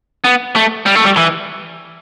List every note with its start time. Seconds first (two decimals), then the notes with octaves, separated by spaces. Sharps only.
0.24 B3
0.56 A3
0.86 G3
0.95 A3
1.04 G3
1.17 E3